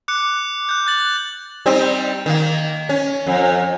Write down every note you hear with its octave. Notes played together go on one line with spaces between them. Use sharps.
D6 F#6 C#7
F#6 G6
F#6 A6 F#7
G3 C4 D#4
D#3 A#3
C#4
F2